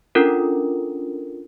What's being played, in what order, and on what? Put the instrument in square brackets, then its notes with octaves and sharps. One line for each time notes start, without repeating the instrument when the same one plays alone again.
[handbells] C#4 D4 F4 A4 A#4